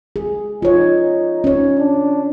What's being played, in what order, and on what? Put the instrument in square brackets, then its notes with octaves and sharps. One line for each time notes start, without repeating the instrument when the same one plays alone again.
[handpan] G#4
[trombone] D#4 [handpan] F4 C#5
[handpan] C#4 C#5
[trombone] D4